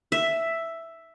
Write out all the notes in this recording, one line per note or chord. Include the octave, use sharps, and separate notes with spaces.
E5